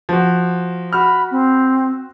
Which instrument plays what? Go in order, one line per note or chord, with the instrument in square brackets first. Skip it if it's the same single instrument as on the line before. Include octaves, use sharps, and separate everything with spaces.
[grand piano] F3 F#4
[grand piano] F#4 F6 [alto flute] B5
[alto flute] C4